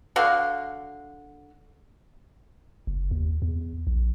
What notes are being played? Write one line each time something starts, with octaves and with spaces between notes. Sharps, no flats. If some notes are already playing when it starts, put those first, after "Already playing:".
D3 F#4 F5
F#1
D#2
E2
A#1